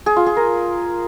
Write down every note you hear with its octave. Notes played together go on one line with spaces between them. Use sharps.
G#4
F4
G#4
A#4